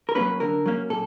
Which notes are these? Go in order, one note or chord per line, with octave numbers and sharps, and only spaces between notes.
A#4
F#3 A#3 C#4 B4
D3 A#4
F#3 A#3 C#4
A#2 A4